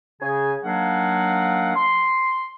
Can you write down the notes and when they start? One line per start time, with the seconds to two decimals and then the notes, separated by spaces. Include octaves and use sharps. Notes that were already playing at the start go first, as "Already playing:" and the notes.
0.21 C#3 G#4 G#5
0.63 D#3 F#3 A#3 D4 F5 F#5
1.76 C6